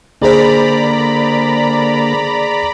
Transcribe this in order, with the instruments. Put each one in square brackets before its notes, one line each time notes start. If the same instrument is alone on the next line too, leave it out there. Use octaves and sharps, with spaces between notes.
[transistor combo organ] D3 A#3 [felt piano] G#4 C5 [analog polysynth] D5 A#5 B5